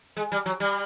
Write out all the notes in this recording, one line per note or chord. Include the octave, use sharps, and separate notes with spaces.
G#3
G3
F#3
G3